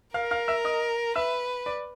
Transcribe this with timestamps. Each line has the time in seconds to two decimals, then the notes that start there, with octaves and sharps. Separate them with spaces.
0.14 A#4 F5 F6
0.31 F5 F6
0.48 E5 E6
0.65 D#5 D#6
1.16 B4 E5 E6
1.66 D5 D6